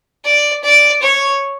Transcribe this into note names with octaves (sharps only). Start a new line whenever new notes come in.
D5
D5
C#5